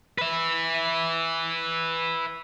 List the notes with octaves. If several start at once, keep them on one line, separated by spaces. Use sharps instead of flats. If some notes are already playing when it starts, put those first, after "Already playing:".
B4 E5